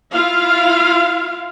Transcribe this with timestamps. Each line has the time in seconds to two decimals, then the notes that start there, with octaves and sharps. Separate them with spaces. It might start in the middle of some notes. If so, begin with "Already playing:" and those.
0.13 E4 F4 F5